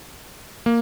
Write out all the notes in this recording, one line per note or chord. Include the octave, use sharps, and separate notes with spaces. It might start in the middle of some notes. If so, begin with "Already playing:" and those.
A#3